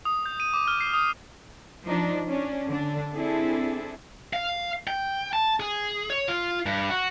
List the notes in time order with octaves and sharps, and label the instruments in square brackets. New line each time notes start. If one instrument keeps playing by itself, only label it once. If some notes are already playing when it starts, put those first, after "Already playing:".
[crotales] D#6
G6
D#7
D6
F6
C7
D#6
[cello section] F3 D4 D#4
C#4 D4
D3 D4
C4 D4 E4 G#4 A4
[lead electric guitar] F5
G5
A5
G#4
C#5
F4
G2
F#4